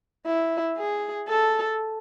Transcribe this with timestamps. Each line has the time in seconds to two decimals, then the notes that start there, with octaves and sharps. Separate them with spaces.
0.26 E4
0.77 G#4
1.29 A4